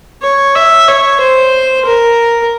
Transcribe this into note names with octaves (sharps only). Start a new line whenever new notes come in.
C#5
E5
C#5
C5
A#4